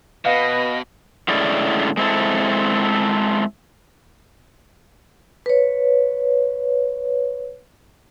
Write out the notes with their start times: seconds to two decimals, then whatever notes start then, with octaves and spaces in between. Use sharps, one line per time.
0.25 B2 B4 D#5 F5
1.28 A2 D3 G#3 C#4 E4 D5
1.97 G#3 C4 E4 A4
5.46 B4 C#5